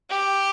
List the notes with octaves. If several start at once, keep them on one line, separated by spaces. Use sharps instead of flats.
G4